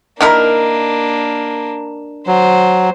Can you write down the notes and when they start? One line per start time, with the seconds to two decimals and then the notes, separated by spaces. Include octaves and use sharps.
0.21 D#3 A#3 D4 E4 A#4
2.27 F#3 C5